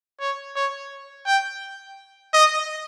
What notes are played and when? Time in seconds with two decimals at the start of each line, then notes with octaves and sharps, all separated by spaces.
0.20 C#5
0.56 C#5
1.26 G5
2.34 D#5